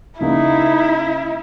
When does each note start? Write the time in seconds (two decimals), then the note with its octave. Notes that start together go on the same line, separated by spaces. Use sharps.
0.21 C#2 A#3 D#4 E4